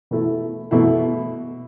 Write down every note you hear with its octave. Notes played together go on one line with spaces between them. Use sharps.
B2 A3 E4
B2 A3 E4